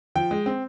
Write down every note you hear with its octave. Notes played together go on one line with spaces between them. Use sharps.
F3 G5
G#3
C4